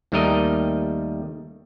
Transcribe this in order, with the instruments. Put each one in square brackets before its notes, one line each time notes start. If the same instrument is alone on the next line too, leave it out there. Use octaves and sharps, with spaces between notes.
[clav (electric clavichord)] D#2 D#3 G3 A3 A#4 D#5